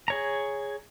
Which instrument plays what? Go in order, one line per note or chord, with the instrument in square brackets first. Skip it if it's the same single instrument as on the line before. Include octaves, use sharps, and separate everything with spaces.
[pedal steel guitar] G#4 C#5 A#5